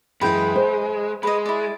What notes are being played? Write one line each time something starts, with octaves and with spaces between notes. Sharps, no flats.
F#2 E3 G#3 B4 G5
C5
G#3 B4 D#5
E4 D5